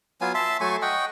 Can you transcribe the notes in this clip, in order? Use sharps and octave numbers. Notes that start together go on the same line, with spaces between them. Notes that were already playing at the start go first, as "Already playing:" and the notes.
F#3 B3 F4 G#5
E5 A5 C6
F#3 A3 G#5 C#6
D#5 F#5 G5 C#6